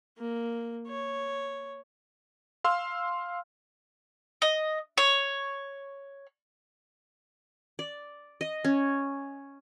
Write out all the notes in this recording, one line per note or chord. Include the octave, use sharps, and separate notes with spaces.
A#3
C#5
F5 C6 E6 F6
D#5
C#5
D5
D#5
C#4